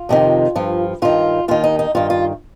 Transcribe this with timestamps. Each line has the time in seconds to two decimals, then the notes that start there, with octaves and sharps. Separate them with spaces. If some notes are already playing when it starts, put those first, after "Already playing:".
Already playing: F4
0.09 F2 C3 D#3
0.55 G2 F3
1.02 G2 D#3 F4
1.48 D#2 D#3 F4
1.64 D#4
1.79 D#4
1.95 G2 D#3 F4
2.10 F4